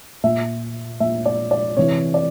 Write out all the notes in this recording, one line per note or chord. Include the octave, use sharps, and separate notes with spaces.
A#2 E5
A#2 E5
D5
D5
C3 E3 C#5
D5